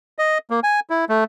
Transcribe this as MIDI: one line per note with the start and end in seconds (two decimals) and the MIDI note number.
0.18 0.38 75
0.50 0.60 58
0.63 0.80 80
0.90 1.05 64
1.09 1.24 57